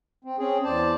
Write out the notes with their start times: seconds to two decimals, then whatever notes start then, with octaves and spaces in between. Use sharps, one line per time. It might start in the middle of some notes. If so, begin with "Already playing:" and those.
0.24 C4
0.39 C4 C#4 G#4
0.64 E2 C5 D5 A5